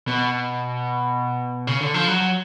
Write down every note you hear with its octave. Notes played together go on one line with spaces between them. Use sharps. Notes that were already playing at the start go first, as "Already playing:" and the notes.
B2
C#3
D3
F3
F#3